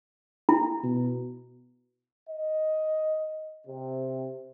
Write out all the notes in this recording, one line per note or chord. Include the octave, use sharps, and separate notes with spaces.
E4
B2
D#5
C3